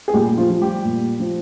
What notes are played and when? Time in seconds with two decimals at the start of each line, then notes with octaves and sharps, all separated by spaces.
0.08 G#4
0.14 A#2 G3 G4
0.38 F3 F4
0.50 F3
0.61 G3 G4
0.85 A#2
1.20 F3